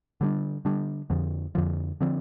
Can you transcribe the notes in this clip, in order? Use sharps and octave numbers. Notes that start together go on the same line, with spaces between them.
D3 G3 D4
D3 G3 D4
F2 D3 F3
F2 D3 F3
D3 F3 C4